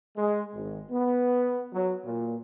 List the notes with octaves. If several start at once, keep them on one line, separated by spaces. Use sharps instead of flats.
G#3
G#1
B3
F#3
A#2